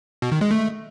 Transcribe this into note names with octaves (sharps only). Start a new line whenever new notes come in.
B2
D#3
G#3
A3